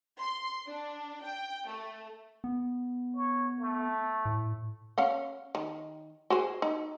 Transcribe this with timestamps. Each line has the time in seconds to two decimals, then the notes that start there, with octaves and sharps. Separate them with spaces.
0.20 C6
0.67 D4
1.24 G5
1.68 A3
2.44 B3
3.16 C#5
3.60 A3
4.25 A2
4.98 C#4 F5 F#5
5.55 D#3
6.30 F#4 G#4 C5
6.62 D#4